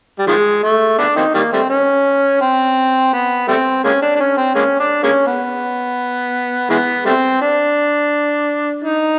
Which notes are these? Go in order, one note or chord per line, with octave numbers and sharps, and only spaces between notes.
G3
D#3 F3 G#3
A3
A3 B3 D4
A#3 C4 D#4
D#3 G3 A#3
G3 A3 C4
C#4
C4
B3
G3 A3 C4
G#3 A#3 C#4
D4
D4
C#4
C4
G#3 A#3 C#4
D4
G#3 A#3 C#4
B3
E3 G#3 B3
G3 A3 C4
D4
D#4